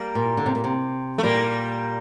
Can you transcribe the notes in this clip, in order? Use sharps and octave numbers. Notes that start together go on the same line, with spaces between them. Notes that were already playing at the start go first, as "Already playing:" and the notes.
Already playing: G3 A#3
A#2
D3
C3
A#2
C3
A3
A#2 G3 A#3